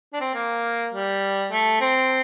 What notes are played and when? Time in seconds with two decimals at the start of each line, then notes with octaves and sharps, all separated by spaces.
0.13 D4
0.21 C4
0.35 A#3
0.93 G3
1.51 A3
1.81 C4